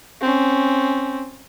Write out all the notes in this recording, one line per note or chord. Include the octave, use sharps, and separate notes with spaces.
C4 C#4